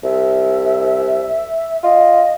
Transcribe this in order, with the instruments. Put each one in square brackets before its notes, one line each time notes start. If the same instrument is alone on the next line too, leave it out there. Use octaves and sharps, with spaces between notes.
[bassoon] C2 [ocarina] E5
[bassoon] F4 [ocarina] D#5